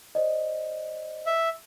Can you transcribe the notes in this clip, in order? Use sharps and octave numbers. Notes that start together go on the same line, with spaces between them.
C5 D5 D#5
E5